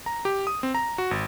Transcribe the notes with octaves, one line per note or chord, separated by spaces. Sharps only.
A#5
G4
D#6
C4
A#5
F#4
G#1